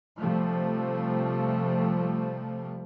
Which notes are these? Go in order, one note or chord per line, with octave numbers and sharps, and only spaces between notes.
C3 F3 G3 A3